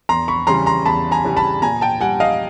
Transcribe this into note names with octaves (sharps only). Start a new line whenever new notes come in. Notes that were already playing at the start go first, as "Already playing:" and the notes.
E2 A#5 C6
B5 C#6
C#3 E3 G3 A#5 C6
A#5 C6
E2 A5 B5
G#5 A#5
C#3 E3 G3
A5 B5
A#2 G#5 A#5
G5 A5
G3 F#5 G#5
D#5 F5